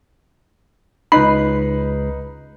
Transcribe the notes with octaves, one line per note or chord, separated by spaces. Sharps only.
C#2 D#4 B4 B5 C7